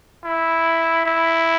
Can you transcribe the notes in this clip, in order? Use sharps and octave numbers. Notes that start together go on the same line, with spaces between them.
E4
E4